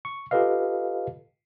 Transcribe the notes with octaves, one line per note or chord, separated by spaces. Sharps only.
C#6
F4 G4 A4 B4 D#5 F5